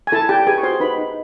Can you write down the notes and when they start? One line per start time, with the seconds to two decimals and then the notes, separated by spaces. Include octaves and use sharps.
0.07 G#5
0.12 E4 A4 A5
0.29 G4 G5
0.47 G#4 B4 G#5
0.58 C#6
0.63 F#4 C5 C6
0.80 D#4 B4 B5
0.98 D#4